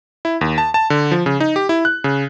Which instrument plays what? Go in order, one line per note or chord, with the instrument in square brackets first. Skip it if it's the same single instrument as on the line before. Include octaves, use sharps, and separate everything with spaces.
[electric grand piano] E4
D#2
A5
A5
D3
F3
C#3
D#4
G4
E4
F#6
C#3